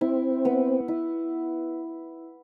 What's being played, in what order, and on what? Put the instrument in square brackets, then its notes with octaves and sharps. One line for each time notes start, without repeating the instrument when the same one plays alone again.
[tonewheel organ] C4 [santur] E4
[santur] B3
E4